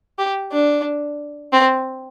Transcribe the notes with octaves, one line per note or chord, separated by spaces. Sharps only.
G4
D4
C4